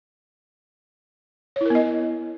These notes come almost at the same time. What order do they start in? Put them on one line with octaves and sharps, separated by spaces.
C#5 E4 A#4 B3 D#5